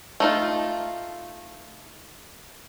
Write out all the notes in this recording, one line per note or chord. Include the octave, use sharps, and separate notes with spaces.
A3 D#4 F4